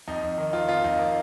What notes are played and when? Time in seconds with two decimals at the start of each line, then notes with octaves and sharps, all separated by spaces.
0.08 F2 D#4
0.23 F2
0.38 D#3
0.53 D#3 F4
0.69 F2 F4
0.84 F2 D#4
0.99 A#3